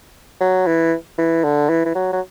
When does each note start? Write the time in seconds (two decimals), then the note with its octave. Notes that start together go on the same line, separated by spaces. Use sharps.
0.41 F#3
0.67 E3
1.18 E3
1.44 D3
1.69 E3
1.85 E3
1.95 F#3
2.12 F#3